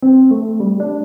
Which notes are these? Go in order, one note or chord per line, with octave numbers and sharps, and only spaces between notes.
C4
A3
G3
D4